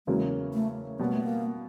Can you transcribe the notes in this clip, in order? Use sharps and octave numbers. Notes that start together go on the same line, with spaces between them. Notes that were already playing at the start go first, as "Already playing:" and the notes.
E2 C#3 F#3 G#3 A#3
A3
B2 G3 A#3 B3
A3
A#3